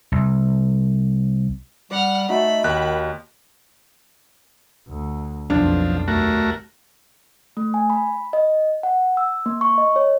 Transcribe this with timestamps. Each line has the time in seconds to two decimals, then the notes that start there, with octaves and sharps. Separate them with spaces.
0.12 C2
1.91 G3 D5 F#5 F6
2.29 A3 D#4 F#4 B5
2.64 D#2 D#3 F#6
4.87 D2
5.50 B1 F2 F3 D4
6.08 D#2 A3 F#4 A#4
7.57 A3
7.74 G#5
7.90 B5
8.33 D#5
8.83 F#5
9.17 E6
9.46 A#3
9.61 C#6
9.78 D#5
9.96 C#5